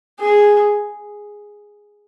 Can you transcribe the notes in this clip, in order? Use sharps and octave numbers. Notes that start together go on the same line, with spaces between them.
G#4